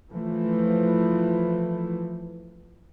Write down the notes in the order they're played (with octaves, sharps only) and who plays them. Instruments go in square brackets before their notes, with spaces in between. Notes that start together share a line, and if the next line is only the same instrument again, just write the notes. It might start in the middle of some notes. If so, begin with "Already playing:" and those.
[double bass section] E3 F3 A3